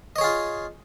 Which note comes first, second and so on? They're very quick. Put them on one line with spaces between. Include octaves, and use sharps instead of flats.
D#5 C#5 G#4 F4